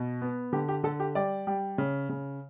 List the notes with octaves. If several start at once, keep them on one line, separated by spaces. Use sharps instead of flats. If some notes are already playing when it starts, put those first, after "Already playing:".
Already playing: B2
B3
D3 G4
G4
D3 A4
G4
G3 D5
G3
C#3
C#3